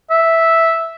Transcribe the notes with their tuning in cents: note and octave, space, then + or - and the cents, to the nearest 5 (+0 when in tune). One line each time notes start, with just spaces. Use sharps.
E5 -5